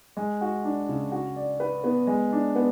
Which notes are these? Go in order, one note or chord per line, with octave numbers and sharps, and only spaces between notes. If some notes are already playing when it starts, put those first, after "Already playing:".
G#3
F#4
D4
C#3
F#4
D5
B4
B3
G#3
D4
B3